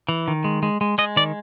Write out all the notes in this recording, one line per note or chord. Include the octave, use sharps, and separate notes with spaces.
E3
D#3
G#3
G#3
G#3
G#3 D#5
D#3 D5